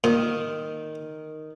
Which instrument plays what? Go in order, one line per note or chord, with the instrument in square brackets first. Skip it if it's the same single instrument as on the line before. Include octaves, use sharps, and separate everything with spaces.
[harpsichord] A#2 [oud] D#3